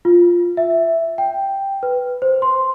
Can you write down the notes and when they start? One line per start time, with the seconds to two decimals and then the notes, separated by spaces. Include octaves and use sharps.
0.05 F4
0.57 E5
1.18 G5
1.83 B4
2.22 C5
2.42 C6